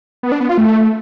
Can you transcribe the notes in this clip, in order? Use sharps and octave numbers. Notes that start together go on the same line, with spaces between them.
B3
D4
B3
F4
A3